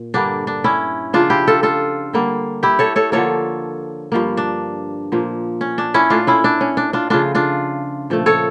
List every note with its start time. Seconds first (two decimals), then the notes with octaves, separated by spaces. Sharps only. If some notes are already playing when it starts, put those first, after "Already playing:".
Already playing: A#2
0.14 G2 D3 G3 A#3 D4
0.47 D4
0.64 C#4 E4
1.13 C#3 F3 A#3 D4 F4
1.30 E4 G4
1.47 F4 A4
1.63 F4 A4
2.14 D3 G3 A#3
2.63 E4 G4
2.79 A4 C#5
2.96 A4 C#5
3.12 D3 F3 A#3 A4 C#5
4.12 G2 F3 A#3
4.37 D4
5.12 A#2 F3 A#3
5.61 C#4
5.78 D4
5.94 C#4 E4
6.10 A#2 A3 D4 F4
6.27 C#4 E4
6.44 D4
6.61 C#4
6.77 D4
6.93 D4 F4
7.10 C#3 F3 A3 D4 F4
7.35 D4 F4
8.10 A#2 F3 A3
8.26 A4 C#5